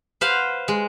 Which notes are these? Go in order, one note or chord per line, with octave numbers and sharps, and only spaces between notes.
B4 C5 F5 F#5
G#3